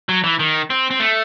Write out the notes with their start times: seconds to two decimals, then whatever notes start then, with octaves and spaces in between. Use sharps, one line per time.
0.09 F#3
0.24 E3
0.39 D#3
0.70 C4
0.91 C4
1.00 A3